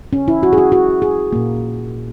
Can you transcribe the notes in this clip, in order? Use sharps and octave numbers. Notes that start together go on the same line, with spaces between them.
C#4
E4
F#4
G#4
F#4
F#4
G#4
A#2 A#3